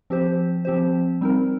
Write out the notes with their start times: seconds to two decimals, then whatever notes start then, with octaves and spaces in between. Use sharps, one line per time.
0.10 F3 C4 G4 C5
0.65 F3 C4 G4 C5
1.21 G3 C4 D#4 A#4